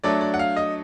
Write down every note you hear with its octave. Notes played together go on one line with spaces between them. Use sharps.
F#3 A3 D4 D5
D5
F#5
F5
D#5